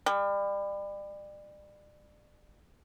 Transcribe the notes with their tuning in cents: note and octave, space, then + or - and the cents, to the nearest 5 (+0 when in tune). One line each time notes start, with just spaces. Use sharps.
G3 +30